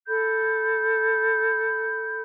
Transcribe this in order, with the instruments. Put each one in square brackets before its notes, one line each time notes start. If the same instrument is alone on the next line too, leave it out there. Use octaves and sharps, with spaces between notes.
[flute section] A4 B5 G6